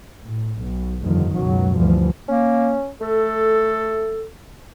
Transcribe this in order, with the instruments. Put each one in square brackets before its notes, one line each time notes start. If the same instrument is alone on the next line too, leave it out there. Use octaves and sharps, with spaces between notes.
[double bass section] A2
B1
F1 G2 D3 D#3 F3
C#2 F#2 B2 F#3
D2 G2 E3 F3
[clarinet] A#3 [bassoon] C#4
[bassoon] A3 [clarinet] A4